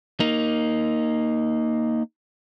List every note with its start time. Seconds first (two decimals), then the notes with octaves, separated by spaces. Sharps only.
0.20 A#3 D#4